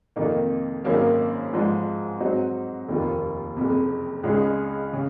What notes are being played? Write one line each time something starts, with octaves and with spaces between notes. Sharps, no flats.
F2 C3 D#3 A#3 D#4
G#1 F#2 D#3 A#3 C#4
G#2 F3 G#3
G#2 F#3 C4 D#4 F#4
F1 D#2 D#3 A#3 F4
F#1 F2 C3
C#2 C#3 G#3 D#4 G#4
C#3